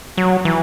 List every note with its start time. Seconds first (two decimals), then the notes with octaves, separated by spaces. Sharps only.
0.18 F#3
0.45 E3